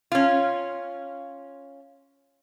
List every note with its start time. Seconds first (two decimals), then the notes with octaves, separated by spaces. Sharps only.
0.12 C#4 F4